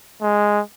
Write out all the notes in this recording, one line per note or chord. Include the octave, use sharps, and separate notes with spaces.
G#3